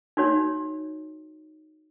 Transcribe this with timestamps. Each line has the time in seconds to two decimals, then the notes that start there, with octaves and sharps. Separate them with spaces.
0.17 D#4 F#4 C#5